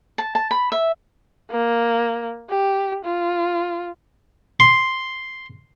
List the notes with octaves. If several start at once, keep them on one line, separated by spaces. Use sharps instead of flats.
A5
A5
B5
E5
A#3
G4
F4
C6